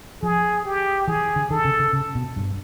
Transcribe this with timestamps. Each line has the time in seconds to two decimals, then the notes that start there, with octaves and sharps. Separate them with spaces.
0.22 F3 G#4
0.65 G4
1.07 E3 G#4
1.36 D3
1.50 D#3 A4
1.65 C#3
1.79 C#3
1.93 C#3
2.15 B2
2.36 G2